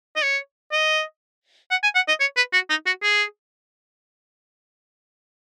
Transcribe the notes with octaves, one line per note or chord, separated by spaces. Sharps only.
D#5
C#5
D#5
F#5
G#5
F#5
D#5
C#5
B4
F#4
D#4
F#4
G#4